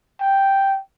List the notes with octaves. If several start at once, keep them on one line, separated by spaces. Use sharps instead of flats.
G5